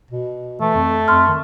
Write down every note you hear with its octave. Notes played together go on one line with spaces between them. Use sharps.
B2
E3 A3
F2
F2 C6 F6
D#3